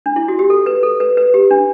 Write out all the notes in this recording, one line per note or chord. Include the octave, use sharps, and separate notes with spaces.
D4
E4
F#4
G4
A4
B4
A4
B4
B4
G4
D4